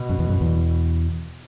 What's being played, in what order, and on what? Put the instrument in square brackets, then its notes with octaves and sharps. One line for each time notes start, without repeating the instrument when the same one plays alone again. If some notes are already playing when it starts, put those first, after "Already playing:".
Already playing: [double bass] B2
[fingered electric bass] F#2
E2
F#2
E2